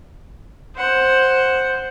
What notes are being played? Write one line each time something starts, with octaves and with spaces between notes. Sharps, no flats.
C5 F#5